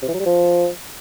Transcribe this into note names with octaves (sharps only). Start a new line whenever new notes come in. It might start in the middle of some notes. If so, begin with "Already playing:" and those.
C3
E3
F#3
G3
F3